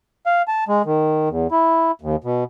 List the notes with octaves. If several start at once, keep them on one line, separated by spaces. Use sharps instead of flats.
F5
A5
G#3
D#3
E2
E4
D#2
B2